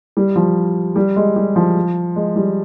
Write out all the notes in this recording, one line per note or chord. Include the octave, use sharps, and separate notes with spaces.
G3
F3
G3
G#3
G3
F3
G#3
G3